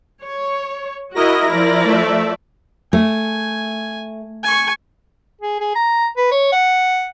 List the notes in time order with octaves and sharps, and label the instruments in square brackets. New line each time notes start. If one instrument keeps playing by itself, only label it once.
[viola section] C#5
[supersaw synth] E4 A#4 A#6 [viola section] F#4 D#5
[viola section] F3 D5
[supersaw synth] A3 E5
[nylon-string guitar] A3 [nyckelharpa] G#5
[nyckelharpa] G#5 C#6
[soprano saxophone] G#4
G#4
A#5
B4
C#5
F#5